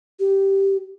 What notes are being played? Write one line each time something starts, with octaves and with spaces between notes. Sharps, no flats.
G4